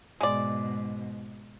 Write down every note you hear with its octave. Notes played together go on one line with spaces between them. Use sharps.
G#2 B2 G#3 D5